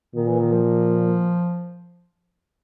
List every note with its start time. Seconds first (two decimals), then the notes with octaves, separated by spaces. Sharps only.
0.15 A#2 D#3
0.28 E3
0.40 D#3
0.52 F3